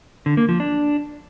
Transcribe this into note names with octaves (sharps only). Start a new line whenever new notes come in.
D3
A#3
F3
D4